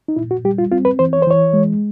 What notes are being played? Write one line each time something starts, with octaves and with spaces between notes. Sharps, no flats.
D#4
A#2 E4
F#4
G3 G4
F4
C4 F4
B4
E3 C5
C#5
C5
E3 C#5
G#3